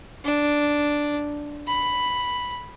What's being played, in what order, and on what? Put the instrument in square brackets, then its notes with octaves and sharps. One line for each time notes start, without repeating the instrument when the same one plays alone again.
[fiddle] D4
B5